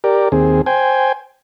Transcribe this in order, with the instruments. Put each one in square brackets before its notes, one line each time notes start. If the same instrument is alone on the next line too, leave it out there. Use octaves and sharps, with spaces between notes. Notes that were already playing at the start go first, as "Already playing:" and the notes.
[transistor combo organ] G4 A#4 D5
D#2 C4 G#4
C5 G5 G#5